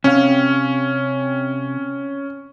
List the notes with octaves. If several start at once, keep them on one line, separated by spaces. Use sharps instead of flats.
C3 C#4 F5